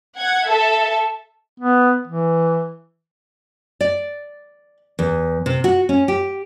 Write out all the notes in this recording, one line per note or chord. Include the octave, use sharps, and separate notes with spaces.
F#5 G#6
A4 E5 A5
B3
E3
D5
E2
C3
F#4
C#4
G4